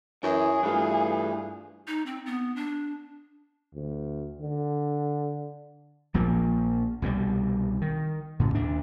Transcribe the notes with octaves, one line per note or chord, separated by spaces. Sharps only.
F#2 E3 G#4
G2 E3 A3 F4
D#4
C4
B3
D4
D2
D3
A#1 A#2 F3 A#3
C2 B2 D#3 G3
D#3
A2 C#3
D#2 D4